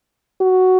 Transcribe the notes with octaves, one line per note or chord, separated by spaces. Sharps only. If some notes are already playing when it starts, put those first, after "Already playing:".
F#4